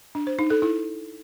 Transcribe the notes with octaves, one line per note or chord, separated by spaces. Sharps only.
D4
C5
D#4
A4
E4